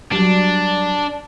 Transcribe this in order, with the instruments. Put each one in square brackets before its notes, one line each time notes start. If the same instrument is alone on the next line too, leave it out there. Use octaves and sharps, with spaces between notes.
[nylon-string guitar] F#3 G3 [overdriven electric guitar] D4